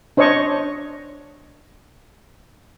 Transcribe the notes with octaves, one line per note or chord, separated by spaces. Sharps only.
D4 C5 C#5 D#5 C#6